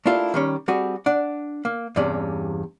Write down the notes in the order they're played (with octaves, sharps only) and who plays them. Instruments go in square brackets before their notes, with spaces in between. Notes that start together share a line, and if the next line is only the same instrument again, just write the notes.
[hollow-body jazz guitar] A3 A#3 D4 E4 F4 G4
D#3 G3 C#4
G3 C4 F#4 G#4
D4 F#5
A#3
E2 G2 C3 C#4 D5